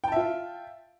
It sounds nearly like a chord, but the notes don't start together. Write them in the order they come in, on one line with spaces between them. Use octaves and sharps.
G5 A5 E5 F4